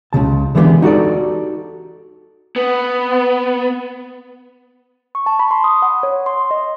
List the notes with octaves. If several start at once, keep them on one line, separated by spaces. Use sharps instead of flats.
C#2 G#2 C#3 A5
D3 E3 G#3 B3 F4 G4
D#4 F#4 G4 A4 D5
B3
C#6
A5
B5
C6
D#6
F#5
C#5
C6
D#5